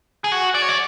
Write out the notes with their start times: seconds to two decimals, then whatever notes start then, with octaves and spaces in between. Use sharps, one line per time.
0.24 G#4
0.32 F#4
0.55 D5
0.62 C#5
0.69 D5